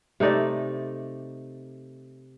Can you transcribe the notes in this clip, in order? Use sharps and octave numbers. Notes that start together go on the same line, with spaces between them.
C3 A3 D#4 D5